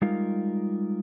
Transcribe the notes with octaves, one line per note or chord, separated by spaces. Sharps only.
G3 G#3 D#4 F4 A#4 F5